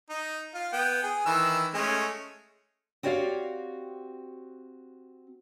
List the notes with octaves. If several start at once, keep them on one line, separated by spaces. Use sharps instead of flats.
D#4
F4
B3 G5
G#4
D#3 E3 E6
G#3 A3 C#4
C4 F#4 G4 C#5 D5 F5